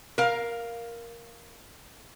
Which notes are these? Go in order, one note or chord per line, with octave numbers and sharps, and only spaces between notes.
A#4 F5